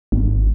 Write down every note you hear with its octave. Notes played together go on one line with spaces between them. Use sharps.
G#1